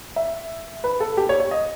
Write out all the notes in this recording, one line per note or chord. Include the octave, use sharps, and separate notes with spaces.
E5
B4
A4
G4
C#5
C#5
D#5